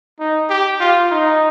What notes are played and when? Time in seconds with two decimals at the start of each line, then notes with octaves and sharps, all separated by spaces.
0.20 D#4
0.50 G4
0.80 F4
1.11 D#4